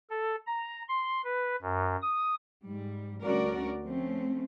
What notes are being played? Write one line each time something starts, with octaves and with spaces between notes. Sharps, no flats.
A4
A#5
C6
B4
F#2
D#6
G#2 G3
D2 G3 C#4 F#4 A#4 D5
F3 A3 C4 C#4